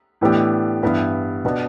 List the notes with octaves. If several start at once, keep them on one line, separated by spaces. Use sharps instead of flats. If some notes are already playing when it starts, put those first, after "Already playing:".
A2 E3 B3 D4 G4
G2 E3 B3 E4
B2 B3 D4